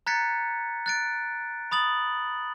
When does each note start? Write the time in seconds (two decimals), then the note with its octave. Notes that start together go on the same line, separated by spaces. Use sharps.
0.07 A#5 F#6 G#6 A6 B6 C#7
0.86 F#6 A6 D7
1.71 B5 D#6 A6 F#7